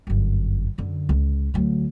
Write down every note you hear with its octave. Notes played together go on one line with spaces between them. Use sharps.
G1 F#2
F#2 D3
C#2
D2 F#3